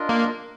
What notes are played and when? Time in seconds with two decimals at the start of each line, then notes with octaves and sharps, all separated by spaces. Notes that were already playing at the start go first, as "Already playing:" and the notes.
Already playing: D4 F4 A#4 D#5
0.09 A#3